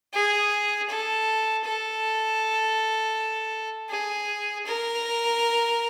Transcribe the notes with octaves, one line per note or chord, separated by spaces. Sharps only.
G#4
A4
A4
G#4
A#4